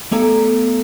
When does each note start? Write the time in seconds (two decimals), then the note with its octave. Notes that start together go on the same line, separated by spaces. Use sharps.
0.12 A3 B3 A4 A#5